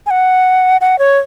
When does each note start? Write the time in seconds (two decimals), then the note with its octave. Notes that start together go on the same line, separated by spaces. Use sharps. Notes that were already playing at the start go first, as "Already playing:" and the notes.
0.06 G#5
0.11 F#5
0.81 F#5
0.99 C#5